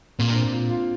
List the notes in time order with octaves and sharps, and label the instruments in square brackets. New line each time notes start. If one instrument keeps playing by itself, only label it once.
[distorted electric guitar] A#2 [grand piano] A#3
[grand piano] D4
C4
F4
F4